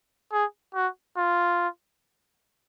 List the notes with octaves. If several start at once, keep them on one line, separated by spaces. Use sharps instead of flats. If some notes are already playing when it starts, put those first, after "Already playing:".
G#4
F#4
F4